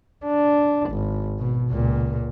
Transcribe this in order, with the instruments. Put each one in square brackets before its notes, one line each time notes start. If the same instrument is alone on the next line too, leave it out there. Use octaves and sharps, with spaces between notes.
[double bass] D4
G#1
B2
C#2 A#2